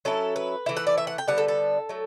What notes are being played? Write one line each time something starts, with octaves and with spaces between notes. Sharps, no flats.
F#3 C#4 E4 A4
B4
E3 A3 E4
F#5
D5
E5
F#5
G5
D3 G3 B3 F#5
A4
A4
F#3 A3